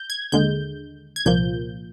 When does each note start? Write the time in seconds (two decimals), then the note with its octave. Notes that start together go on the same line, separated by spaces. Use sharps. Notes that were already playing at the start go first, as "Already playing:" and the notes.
Already playing: G6
0.10 G#6
0.32 D#2 D3 G#3 G6
1.16 G#6
1.25 C2 A#2 F3 A#3 G6